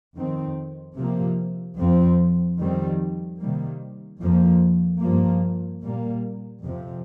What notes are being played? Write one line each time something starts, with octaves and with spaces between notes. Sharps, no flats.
F2 D#3 C4
C3 F3 A#3
F2 F3 C4
F2 D#3 G3 C4
C3 D#3 G3 A#3
F2 F3 A#3
G2 F3 A#3
A#2 G3 A#3
F2 C3 F3